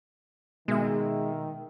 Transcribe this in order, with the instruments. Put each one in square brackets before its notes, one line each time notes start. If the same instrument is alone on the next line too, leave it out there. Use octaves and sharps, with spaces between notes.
[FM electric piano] B2 E5 [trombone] D#3 [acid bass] G#3